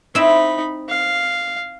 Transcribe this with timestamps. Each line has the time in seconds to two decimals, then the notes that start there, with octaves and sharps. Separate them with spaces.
0.15 C4 D#4 E4 E5 B5
0.89 F5